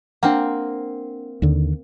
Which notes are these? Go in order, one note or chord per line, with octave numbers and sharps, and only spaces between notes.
A#3 C4 D4 F#5
D#2 D3